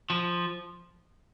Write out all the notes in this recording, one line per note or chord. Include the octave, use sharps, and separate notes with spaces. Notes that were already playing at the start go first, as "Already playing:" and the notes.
F3